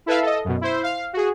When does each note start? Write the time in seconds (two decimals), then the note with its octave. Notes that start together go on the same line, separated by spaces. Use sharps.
0.06 E4 A4 B4 E5 F5
0.22 A4 D#5
0.45 F#2 B2
0.61 E4 C5
0.83 F5
1.13 F#4 G#4